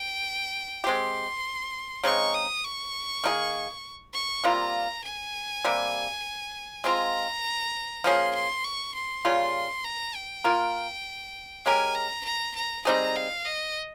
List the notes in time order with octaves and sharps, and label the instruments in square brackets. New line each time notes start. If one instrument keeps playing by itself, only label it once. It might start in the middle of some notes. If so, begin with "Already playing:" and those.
Already playing: [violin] G5
[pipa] G#3 C4 G4 [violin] C6
[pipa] C#3 G#3 C4 D#4 [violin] C#6
[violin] D#6
C#6
[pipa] D#3 A#3 D#4 G#4
[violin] C#6
[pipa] C3 G3 A#3 F4 [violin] A#5
[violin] G#5
[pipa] C3 G3 A#3
[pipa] G#3 C4 F4 [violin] A#5
[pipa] F3 A#3 C#4 G#4 [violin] C6
[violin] C6
C#6
C6
[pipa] C#3 G3 A#3 F4
[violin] A#5
G5
[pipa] A#3 F4 A#4
[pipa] G#3 C#4 G4 A#4 [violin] G#5
[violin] A#5
A#5
A#5
[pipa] G3 C4 D#4 G#4 [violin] A#5
[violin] F5
D#5